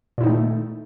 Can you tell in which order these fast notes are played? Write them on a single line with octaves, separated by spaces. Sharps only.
A#2 E4 D#4 D#3 A3